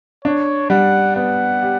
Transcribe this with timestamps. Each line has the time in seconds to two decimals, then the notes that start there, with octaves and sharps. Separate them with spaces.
0.25 D4 C#5
0.70 G3 F#5
1.16 B3 F#5
1.63 G4